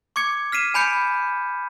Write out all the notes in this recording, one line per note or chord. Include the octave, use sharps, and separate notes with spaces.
C#6 D6 G#6 C#7
F6 B6 C7 D#7 E7
G#5 B5 G6 C#7